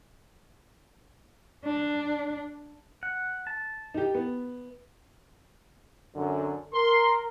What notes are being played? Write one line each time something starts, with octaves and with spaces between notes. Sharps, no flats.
D4
F#5
A5
D#4 G4
B3
F#2 D3
A#4 C6